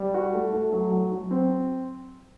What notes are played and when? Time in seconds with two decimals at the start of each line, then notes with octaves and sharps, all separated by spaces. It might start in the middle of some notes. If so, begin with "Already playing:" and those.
Already playing: G3
0.14 F#4
0.33 A3
0.53 A3
0.73 F#3
0.91 F#3
1.12 F#3
1.31 C4